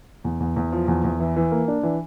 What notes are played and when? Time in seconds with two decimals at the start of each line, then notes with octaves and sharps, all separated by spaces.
0.24 E2
0.40 E2
0.56 E2
0.72 F3
0.88 E2
1.04 E2
1.20 E3
1.36 E3
1.51 A#3
1.68 D4
1.83 E3